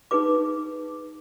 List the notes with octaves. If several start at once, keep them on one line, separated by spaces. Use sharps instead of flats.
D#4 G#4 B4 D6